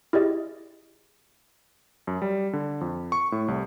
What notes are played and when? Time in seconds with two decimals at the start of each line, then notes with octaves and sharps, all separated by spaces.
0.13 E4 G4 G#4 D5 D#5
2.07 F#2
2.22 G3
2.53 D3
2.81 F2
3.12 C#6
3.32 A2
3.48 C2